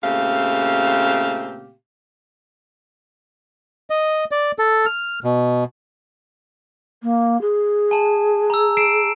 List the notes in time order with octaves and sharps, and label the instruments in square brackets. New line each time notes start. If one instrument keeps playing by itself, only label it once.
[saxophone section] A#2 C#3 A3 C4 G4 F5
[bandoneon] D#5
D5
A4
F6
B2
[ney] A#3
G#4
[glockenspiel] G#5 A5
A#5 E6
C7 D7 E7